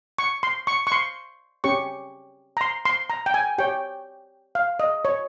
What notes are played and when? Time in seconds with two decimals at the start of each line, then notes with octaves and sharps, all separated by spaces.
0.19 C#6
0.43 C6
0.67 C#6
0.87 C#6
0.92 C6
1.64 C#4 G4 C#5 C#6
2.57 A#5
2.61 C6
2.85 C6
3.10 A#5
3.26 G5
3.34 G#5
3.58 G4 C#5 G5
4.55 F5
4.80 D#5
5.05 C#5